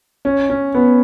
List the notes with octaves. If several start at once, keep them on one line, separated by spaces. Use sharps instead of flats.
C#4
C#4
B3